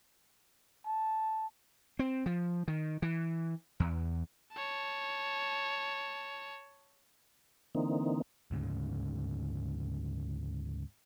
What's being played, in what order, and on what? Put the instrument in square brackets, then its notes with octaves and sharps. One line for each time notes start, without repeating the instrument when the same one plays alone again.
[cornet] A5
[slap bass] C4
F3
D#3
E3
E2
[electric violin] C#5 A5
[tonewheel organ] D3 E3 A#3 C4 D#4
[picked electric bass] D2 G#2 C#3